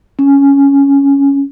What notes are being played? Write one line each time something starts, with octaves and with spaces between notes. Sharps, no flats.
C#4